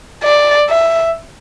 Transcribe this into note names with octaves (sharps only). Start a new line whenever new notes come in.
D5
E5